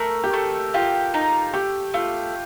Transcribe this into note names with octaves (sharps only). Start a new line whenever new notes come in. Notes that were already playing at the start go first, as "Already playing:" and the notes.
Already playing: A3 A#4
G4
A3 A4
F4 G4
D#4
A3 G4
A3 F4